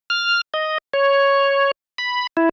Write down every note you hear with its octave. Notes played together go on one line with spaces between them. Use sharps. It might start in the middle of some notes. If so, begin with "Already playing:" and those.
F6
D#5
C#5
B5
E4